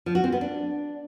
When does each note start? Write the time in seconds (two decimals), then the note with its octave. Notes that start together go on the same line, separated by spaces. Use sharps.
0.06 F3
0.15 F#4
0.24 C4
0.32 B3
0.41 D4